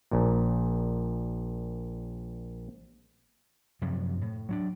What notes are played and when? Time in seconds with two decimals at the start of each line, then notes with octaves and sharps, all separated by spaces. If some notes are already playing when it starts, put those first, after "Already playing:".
0.11 A#1 A#2
3.82 F#2 C3 F3 F#3
4.21 A2
4.49 F#3 C#4 D4